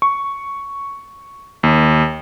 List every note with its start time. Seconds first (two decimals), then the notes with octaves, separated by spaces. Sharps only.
0.02 C#6
1.63 D#2